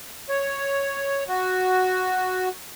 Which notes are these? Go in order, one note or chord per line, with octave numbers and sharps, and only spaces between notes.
C#5
F#4